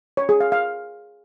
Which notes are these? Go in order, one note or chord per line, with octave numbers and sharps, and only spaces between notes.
C#5
G#4
F5
F5